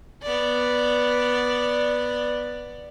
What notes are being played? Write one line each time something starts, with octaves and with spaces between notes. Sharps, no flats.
B3 D5